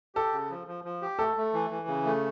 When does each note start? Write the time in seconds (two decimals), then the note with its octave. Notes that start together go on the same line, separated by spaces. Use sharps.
0.15 G4 A4
0.33 C#3
0.50 F3
0.67 F3
0.84 F3
1.02 G4
1.19 A3 A4
1.37 A3
1.54 E3
1.70 E3
1.87 C#3
2.05 A3